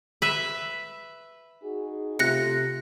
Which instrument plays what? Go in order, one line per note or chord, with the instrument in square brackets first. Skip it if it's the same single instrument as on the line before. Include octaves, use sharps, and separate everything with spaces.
[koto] B4 E5
[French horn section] D#4 F#4 G#4
[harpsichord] C3 [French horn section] A3 F4 [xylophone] F#6 A#6 C#7